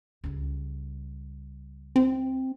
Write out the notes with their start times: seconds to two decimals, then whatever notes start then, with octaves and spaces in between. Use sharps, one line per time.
0.24 C#2 G3
1.96 C4